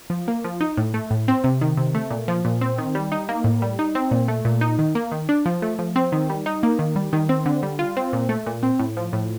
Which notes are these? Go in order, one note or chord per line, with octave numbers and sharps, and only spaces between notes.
F3
A#3
F3
D#4
A2
A3
A2
C4
C3
D#3
C3
A3
A#2
F3
A#2
C4
D#3
G3
D#4
A#3
A2
G3
D#4
C4
A#2
A3
A#2
D#4
D#3
A#3
D#3
D4
F3
A3
F3
C4
D#3
G3
D#4
A#3
D#3
G3
D#3
C4
D3
G3
F4
C4
A#2
A3
A#2
C4
A2
F3
A2